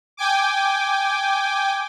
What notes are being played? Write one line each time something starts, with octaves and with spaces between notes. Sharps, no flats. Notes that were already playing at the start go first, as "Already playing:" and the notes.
G5 G#5 D6